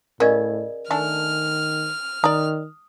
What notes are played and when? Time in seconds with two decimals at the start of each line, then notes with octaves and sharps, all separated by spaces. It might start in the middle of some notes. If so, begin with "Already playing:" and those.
0.20 A2 C#3 C#4 A#4 D5 D#5
0.91 D#3 A3 D4 A4 G#5 F6
2.24 D#3 D5 A#5 D#6